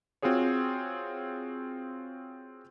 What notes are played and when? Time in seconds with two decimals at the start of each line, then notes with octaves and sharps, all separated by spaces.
0.22 C4 F4 F#4 G#4 C#5